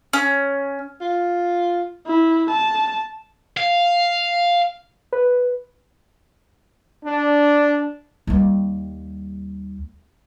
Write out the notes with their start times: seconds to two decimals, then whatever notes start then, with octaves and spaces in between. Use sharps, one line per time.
0.13 C#4
1.01 F4
2.07 E4
2.50 A5
3.57 F5
5.13 B4
7.05 D4
8.27 D#2 G3